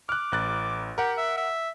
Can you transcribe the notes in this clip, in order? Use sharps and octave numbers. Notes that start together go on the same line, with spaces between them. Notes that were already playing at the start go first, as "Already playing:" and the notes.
D6 F6 F#6
A1 F#6 A6
G4 A#4 F#5
E5
E5